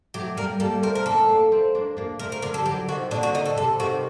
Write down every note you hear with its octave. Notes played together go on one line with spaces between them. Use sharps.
F#3 A3 G4
G3 A#3 A#4
G3 A#3 A4
A3 C4 A#4
A#4
A#3 D4 A4
A#3 D4
A3 C4
A#3 D4
A#3 D4
A3 C4 A#4
A#4
D3 F#3 A#4
A4
G3
D3 F#3 G4
C3 D#3 F#4
A#2 D3 D4
F#4
D#4
A4
C3 A4
C3 D#3 F#4